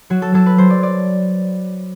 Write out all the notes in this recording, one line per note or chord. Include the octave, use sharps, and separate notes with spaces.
F#3 F#4
A4
F#3 A4
B4
F#3 C5
D5
D5